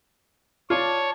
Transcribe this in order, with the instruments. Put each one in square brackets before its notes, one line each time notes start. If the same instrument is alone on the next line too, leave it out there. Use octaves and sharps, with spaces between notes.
[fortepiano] F4 [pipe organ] C#5 [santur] D5 A5